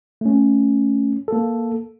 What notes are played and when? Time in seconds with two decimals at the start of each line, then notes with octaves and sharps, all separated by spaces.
0.21 A3 C#4
1.28 A#3 A4